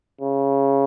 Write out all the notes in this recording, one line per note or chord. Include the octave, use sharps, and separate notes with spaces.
C#3